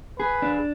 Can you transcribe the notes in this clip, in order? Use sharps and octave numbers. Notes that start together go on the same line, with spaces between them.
G#4 B4
D4